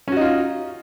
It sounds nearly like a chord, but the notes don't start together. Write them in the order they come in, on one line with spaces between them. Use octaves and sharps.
C#4 F#4 D#4 F4